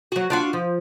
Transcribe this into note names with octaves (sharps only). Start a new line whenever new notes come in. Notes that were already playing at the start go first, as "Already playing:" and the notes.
F#3 F#4
D4 F4 F#4
F3